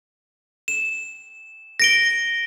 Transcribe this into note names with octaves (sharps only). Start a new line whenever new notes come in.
E7
A#6 D7 G7